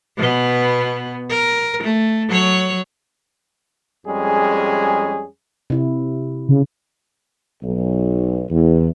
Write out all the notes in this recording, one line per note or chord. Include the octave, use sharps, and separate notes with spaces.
B2 B3
A#4
A3
F#3 C#5
F2 G3 G#3 C#4 G#4
C3 E4
C#3
B1
E2